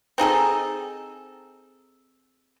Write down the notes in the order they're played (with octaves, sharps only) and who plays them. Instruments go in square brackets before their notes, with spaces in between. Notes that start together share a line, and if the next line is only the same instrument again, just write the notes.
[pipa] C4 D#4 G#4 A4